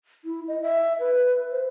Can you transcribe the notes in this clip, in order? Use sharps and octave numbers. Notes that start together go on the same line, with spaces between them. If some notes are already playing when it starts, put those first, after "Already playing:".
E4
D#5
E5
B4
C5